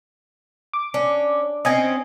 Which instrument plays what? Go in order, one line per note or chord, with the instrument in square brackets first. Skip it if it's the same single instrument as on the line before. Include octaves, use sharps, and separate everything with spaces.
[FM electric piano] D6
[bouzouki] C#4 [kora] D4
[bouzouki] C4 C#4 [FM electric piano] D#5 G#5